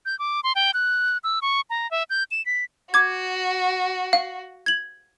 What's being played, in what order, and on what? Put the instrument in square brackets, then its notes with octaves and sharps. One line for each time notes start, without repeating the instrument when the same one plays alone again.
[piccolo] G6
D6
C6
G5
F#6
E6
C#6
A#5
E5
G6
E7
B6
[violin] F#4 [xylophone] D6 G#6
[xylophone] F5
G#6 F#7